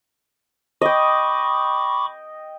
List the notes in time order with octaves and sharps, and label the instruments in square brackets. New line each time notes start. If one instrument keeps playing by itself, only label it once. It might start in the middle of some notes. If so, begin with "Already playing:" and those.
[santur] D#5 G5 [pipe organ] B5 C#6 D6